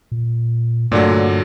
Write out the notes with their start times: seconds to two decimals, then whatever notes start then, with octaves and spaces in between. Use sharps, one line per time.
0.12 A#2
0.92 G2 A#2 D3 F#3 A3 D5